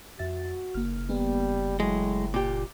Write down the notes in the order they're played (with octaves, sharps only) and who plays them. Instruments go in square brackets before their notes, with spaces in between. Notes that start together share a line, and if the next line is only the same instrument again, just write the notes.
[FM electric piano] F2 E5 A6 [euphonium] F#4
[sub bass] F#1 [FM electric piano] A#3 F6
[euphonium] G3 [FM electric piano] A#3 B3
[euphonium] A2 [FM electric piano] F#3 [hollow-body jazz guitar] G#3
[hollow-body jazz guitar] A#2 G4 [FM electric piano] D6